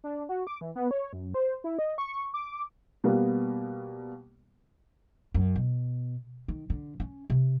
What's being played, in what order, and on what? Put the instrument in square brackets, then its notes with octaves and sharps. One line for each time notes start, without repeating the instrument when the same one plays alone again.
[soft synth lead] D4
F#4
D6
E3
B3
C#5
F#2
C5
E4
D#5
C#6
D6
[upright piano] B2 G3 A#3 B3
[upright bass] F#2
B2
D#3
D3
C#4
C3